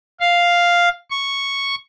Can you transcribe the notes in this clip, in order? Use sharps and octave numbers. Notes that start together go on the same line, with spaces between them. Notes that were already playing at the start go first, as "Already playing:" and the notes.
F5
C#6